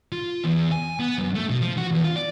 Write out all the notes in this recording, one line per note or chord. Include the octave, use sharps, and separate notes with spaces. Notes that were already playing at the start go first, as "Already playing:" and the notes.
F4
E2
G#5
B3
F#2
A3
B2
F3
F#4
E2
F4
D5